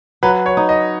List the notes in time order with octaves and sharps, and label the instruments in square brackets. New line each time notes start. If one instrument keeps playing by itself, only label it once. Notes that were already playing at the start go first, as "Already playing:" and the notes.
[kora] F#3 [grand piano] B4
[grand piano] C#5
[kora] D#4
[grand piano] D#5